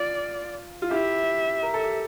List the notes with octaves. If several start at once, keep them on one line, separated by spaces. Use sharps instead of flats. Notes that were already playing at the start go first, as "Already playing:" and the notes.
Already playing: F4 D5
F4
E4 G4 E5
A#4
A4
G4